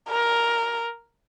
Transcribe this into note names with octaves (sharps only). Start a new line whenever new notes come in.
A#4